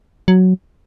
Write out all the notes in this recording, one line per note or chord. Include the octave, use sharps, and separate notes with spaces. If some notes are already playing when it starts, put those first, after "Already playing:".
F#3